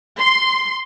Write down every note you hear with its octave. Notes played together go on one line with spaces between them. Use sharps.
C6